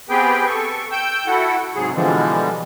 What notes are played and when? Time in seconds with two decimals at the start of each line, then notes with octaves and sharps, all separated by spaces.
0.10 B3 C4 G4 G#4 B4 G5
0.46 A4 C#6
0.92 G5 E6 G6
1.27 E4 F#4 A4 F#5
1.75 G#2 C3 F#3 G#4
1.94 B2 D3 E3 F3 G3 G#3